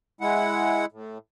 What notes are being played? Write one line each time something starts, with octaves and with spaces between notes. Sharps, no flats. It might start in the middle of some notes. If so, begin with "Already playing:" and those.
G#3 E4 F#5
A2